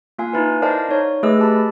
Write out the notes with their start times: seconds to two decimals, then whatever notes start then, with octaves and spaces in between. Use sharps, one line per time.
0.18 A#3 F4 F5 G#5
0.33 D#4 E4 B4
0.62 A#4 C5 D5 D#5 F5 A5
0.89 D#4 C#5
1.23 A3 G#4 B4 D#5 E6
1.39 G4 A5 B5